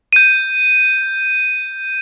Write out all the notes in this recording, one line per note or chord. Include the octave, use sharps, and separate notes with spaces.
G6 D#7